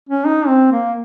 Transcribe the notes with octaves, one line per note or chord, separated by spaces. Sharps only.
C#4
D#4
C4
A#3